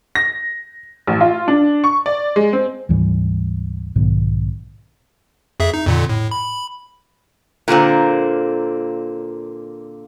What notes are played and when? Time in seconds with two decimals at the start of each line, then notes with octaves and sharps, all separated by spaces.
0.15 A#6
1.07 A1
1.21 F4
1.48 D4
1.84 C#6
2.06 D5
2.36 G#3
2.53 C4
2.89 D2 G#2 E3 G3
3.96 B1 G#2 B2 D#3
5.60 F2 G#4 E5
5.74 D#4
5.86 F2 A#2 D3
6.09 A2
6.31 B5
7.68 A#2 D3 A#3 C4